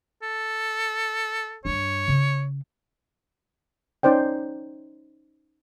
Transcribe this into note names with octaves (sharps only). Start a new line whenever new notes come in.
A4
G2 D4 C#5
C#3
C#4 D#4 C5 D5 G5